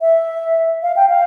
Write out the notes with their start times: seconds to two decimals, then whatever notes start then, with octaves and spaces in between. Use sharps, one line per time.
0.01 E5
0.83 F5
0.96 G5
1.09 F5